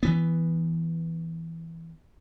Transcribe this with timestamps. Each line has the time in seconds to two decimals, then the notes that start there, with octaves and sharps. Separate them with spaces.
0.03 E3 B3